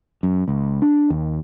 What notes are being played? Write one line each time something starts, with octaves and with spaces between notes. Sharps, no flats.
F#2
C#2
D4
D#2